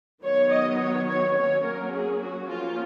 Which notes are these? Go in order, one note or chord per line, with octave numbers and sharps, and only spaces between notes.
D#3 F#3 B3 C#5
D#5
C#5
C#5
F#3 A#3 C#4 C#5
A#4
G#4
F#4
F3 A#3 C#4 F4